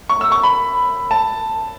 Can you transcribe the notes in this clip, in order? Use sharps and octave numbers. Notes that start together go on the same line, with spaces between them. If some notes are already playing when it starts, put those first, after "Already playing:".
C#6
E6
C#6
B5
A5